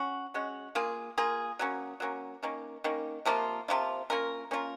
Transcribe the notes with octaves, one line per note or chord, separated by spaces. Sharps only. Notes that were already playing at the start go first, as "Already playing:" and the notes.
Already playing: C#4 F#4
G#3 C#4 F#4
A#3 F4 G#4
A#3 F4 G#4
F#3 A#3 C#4
F#3 A#3 C#4
D#3 A#3 C#4
D#3 A#3 C#4
C3 F3 A#3 F4
C3 F3 A#3 F4
A#3 C#4 F4 A#4
A#3 C#4 F4 A#4